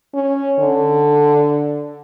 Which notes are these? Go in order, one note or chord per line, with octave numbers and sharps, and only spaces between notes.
C#4
D3